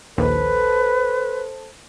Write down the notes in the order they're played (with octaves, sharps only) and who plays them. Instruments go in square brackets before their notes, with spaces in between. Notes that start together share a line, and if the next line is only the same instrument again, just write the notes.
[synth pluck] A#1 D#2 [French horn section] A4 C5 [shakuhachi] B4